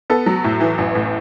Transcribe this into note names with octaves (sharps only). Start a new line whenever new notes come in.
B3 A4
F#3
A2
E3
A1
A2